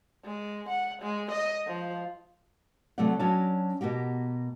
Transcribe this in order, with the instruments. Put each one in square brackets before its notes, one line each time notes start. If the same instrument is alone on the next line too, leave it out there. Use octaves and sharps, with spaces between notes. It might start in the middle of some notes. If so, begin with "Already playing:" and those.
[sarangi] G#3
F#5
G#3
D#5
F3
[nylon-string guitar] C3 F#3 A3 G4 D5 F#5
F#3 C#4 D4 F#4 A5
B2 A#3 F#4 G4